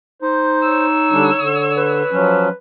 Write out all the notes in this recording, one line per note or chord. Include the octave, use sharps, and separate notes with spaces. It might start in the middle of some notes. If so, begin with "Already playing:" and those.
D#4 C5
C#5 E6
D3 G3 D4
D3
B4
F3 F#3 C#4